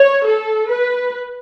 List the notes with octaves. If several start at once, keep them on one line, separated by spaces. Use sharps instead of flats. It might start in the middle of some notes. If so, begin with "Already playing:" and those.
Already playing: C#5
A4
B4